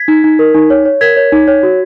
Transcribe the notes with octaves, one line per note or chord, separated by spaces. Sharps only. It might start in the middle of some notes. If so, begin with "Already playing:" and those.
Already playing: G#6 B6
D#4
D#4
A#4
D#4
C#5
C#5
A#4 G#6 B6
C#5
D#4
C#5
F#4